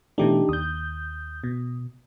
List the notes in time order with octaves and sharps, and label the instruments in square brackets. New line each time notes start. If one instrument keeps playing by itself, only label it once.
[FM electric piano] B2 E3 A3 [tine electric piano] D4 D#4 G4
[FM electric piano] D#2 G6 [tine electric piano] D#6
[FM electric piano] B2